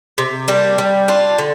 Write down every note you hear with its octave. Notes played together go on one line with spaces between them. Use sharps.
C3
G3 A#3 D4
G3
D4 F4
D3